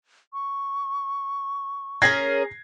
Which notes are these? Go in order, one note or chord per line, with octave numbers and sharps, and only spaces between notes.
C#6
C#4 G#4 A#4 G#6 A#6 C7